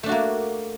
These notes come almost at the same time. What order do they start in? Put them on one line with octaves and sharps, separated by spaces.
A3 D4 F#4 A#3